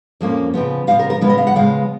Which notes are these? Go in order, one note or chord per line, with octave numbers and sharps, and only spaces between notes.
F2 F3 A#3 C#4
C#3 F3 B3
C#3 F3 B3 F5
A#4
A#4
C#3 F3 G#3 B3 B4
D#5
F5
F#5
C#3 F3 G#3 B3 F5